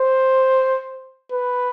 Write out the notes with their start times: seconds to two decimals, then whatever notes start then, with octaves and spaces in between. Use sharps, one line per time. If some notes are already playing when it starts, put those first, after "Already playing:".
Already playing: C5
1.32 B4